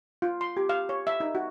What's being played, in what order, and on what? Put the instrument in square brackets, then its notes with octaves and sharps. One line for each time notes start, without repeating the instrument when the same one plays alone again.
[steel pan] F4
C6
G4
F5
C#5
E5
D#4
F#4